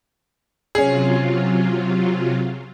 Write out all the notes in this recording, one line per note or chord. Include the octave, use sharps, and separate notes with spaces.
C3 F#3 C#4 F4 G#4